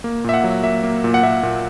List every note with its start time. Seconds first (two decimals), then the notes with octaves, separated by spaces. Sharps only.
0.04 A#3
0.24 A#2 E5
0.34 F#5
0.44 F#3
0.64 A#3 E5
0.84 A#3
1.04 A#2
1.14 F#5
1.23 A#2 E5
1.43 A#2